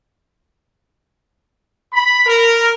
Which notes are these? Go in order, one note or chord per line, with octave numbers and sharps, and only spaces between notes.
B5
A#4